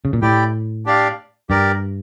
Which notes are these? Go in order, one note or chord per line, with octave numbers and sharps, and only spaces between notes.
C#3
A#2
A2 E4 G4 D5 G5
D4 G4 D5 F5
G2 G4 A#4 D5